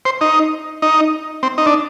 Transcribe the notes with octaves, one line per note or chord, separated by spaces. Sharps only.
C5
D#4
D#4
C4
D#4
D4